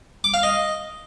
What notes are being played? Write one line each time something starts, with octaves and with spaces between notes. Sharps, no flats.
D6
F5
D#5